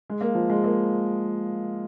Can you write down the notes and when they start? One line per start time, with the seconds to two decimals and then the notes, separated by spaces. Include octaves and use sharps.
0.10 G#3
0.21 A#3
0.35 F3
0.50 G#3
0.64 A#3